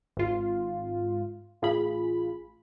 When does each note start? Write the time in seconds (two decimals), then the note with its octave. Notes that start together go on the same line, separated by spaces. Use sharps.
0.17 G#1 F4
1.62 A1 F4 G#4 B5